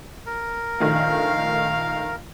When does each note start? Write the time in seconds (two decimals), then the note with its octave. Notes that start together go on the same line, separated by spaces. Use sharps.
0.26 A#4
0.80 A#1 D#3 A3 F5